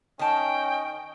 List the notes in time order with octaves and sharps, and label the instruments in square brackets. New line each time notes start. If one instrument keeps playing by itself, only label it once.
[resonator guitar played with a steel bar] D#3 A5 [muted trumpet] C#4 [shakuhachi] D#5 [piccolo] G5